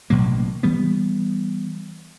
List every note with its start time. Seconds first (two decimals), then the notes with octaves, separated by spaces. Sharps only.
0.10 A1 B2 F#3 A#3
0.63 E3 G3 B3